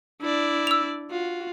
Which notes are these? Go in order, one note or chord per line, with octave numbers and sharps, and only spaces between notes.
D4 E4 D5
E6 F7
F4 F#4